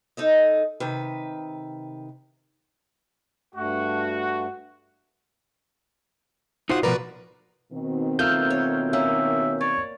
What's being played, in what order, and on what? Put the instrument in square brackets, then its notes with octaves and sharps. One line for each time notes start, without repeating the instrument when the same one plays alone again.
[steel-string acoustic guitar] D#4 A4 D#5
C3 D#3 B4
[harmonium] G2 A3 [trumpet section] F#4
[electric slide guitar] D#4 F4 C5 [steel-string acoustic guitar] F#4 F#5
[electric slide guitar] B2 F3 A#4 [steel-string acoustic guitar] F#4 B4 D5
[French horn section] B2 D#3 C4
[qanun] A3 A#3 F4 [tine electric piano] E6 F6 G6
[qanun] C#5
[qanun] A#3 C#4 [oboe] E5
[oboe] C#5 [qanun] D5